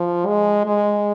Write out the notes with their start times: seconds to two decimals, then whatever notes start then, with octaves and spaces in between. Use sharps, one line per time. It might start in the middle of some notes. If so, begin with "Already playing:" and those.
Already playing: F3
0.26 G#3
0.66 G#3